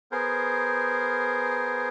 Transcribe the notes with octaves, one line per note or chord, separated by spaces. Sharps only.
B3 G#4 A#4 C5